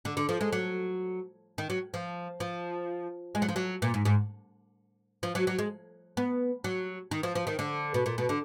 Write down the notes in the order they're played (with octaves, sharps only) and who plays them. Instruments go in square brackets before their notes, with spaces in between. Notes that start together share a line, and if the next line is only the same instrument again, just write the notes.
[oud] D3
D3
F3
G#3
F#3
D#3
F#3
F3
F3
G#3
F#3
F3
F#3
A#2
G#2
G#2
F3
F#3
F#3
G#3
B3
F#3
D#3
F3
F3
D#3
D3
B2
A#2
B2
D3